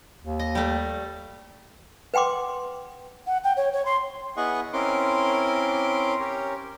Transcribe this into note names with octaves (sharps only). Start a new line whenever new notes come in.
D#2
D#5
G3 A3
B4 F#5 G5 C6 D6
F#5
G5
C#5
C#5
C6
B3 E4 G#4 D#5 F#5 C#6
C4 C#4 E4 A#4 C6 D6
C#4 G4 A#4 C#5